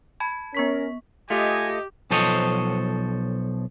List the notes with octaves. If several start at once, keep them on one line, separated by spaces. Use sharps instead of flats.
A5 B5 G#6
B3 C#4 A#4 C#6 B6
A3 F4 G4 D#5 G#5
B1 F3 A4 C5 C#5 D#5